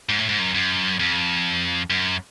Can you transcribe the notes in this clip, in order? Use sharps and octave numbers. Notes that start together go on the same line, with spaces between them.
G#2
A2
G#2
F#2
F#2
F2
F#2